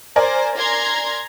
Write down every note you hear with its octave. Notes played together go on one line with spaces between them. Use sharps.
A#4 C5 D5 G#5
A#5 C6 G#6